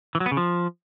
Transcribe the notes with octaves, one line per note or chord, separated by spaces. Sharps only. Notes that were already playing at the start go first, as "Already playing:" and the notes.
E3
F#3
B3
C#3
F3